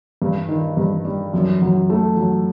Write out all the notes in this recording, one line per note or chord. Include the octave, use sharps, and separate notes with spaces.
G2
D#3
G2
G3
F#2
F#3
A3
F#3